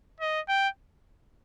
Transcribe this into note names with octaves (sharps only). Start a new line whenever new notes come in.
D#5
G5